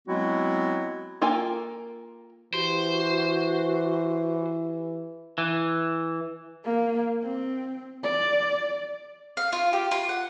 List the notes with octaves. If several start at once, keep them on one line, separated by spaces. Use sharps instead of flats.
F#3 G#3 B3 C4 E4 F#4
A#3 F4 A4 G5 G#5
E3 F#4 G4 C5
E3
A#3
C4
D5
F5
F4
G4
F4
F#5